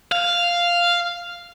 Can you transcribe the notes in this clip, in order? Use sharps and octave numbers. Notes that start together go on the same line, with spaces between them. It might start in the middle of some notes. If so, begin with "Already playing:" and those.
F5